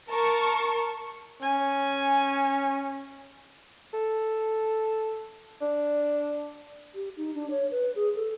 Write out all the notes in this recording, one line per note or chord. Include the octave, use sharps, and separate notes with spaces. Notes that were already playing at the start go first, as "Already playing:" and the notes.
A#4 A5 C#6
C#4 G#5
A4
D4
G4
D#4
D4
C#5
B4
G#4
A4